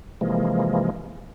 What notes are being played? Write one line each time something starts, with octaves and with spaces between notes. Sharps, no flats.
C3 E3 F3 G#3 A#3